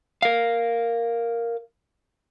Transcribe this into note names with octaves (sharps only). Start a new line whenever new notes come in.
A#4 F5